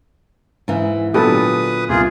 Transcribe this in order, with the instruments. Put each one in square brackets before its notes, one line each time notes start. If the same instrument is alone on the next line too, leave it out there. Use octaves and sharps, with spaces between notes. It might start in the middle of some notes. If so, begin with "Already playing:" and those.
[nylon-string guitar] G#2 E3
[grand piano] A#2 D3 F#3 [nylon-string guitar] B3 [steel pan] G4 A4 [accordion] B4 D#6
[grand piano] C2 A#2 [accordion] F4 G#4